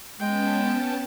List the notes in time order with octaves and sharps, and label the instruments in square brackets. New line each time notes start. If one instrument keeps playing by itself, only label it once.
[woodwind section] G#3 [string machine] B3 C#4 A5 [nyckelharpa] G5